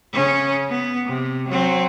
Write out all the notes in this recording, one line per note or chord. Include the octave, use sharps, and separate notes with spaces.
C#3 C#4
B3
C3
F#3 C4